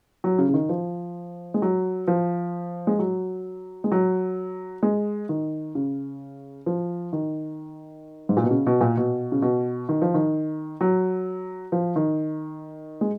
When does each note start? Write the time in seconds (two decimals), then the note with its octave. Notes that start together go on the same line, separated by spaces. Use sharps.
0.24 F#3
0.39 C#3
0.49 C#3
0.54 D#3
0.69 F3
1.54 G#3
1.62 F#3
2.08 F3
2.87 G#3
2.99 F#3
3.84 G#3
3.92 F#3
4.83 G#3
5.29 D#3
5.75 C#3
6.66 F3
7.13 D#3
8.29 G#2
8.37 A#2
8.44 B2
8.51 C#3
8.67 B2
8.81 A#2
8.97 B2
9.32 C#3
9.42 B2
9.89 D#3
10.02 F3
10.14 D#3
10.81 F#3
11.72 F3
11.96 D#3
13.01 G#3